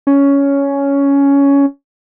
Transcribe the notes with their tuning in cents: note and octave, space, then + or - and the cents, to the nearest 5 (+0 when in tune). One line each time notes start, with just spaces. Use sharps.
C#4 +10